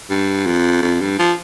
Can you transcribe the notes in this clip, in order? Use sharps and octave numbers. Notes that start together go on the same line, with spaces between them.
G2
F2
F2
G2
F3